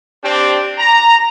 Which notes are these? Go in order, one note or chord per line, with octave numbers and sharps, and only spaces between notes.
C4 D4 G4
A#5